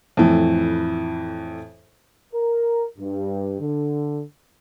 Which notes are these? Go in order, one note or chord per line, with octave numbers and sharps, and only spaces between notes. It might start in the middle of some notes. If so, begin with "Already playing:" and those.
F2 A2 E3
A#4
G2
D3